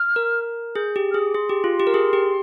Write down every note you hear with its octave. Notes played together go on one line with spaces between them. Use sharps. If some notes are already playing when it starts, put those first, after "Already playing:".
Already playing: F6
A#4
G#4 G6
G4
F6
G#4 D#6
D6
G#4 C6
G4
F4
G4
A#4
G#4
G4